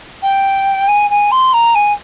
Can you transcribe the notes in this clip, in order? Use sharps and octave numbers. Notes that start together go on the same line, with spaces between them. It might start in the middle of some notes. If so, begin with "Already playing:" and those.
G5
G#5
G#5
C6
A#5
G#5